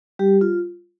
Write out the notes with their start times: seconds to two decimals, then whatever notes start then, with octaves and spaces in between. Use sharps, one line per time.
0.19 G3 G4
0.41 F4